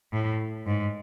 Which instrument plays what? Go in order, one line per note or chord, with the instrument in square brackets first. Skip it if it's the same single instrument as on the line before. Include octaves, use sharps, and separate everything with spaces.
[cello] A2
G#2